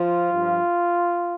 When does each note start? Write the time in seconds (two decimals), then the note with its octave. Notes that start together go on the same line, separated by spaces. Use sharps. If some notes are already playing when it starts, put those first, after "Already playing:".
Already playing: F3 F4
0.32 G2 F3